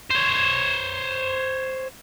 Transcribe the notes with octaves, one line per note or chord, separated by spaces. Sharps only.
C5 C#5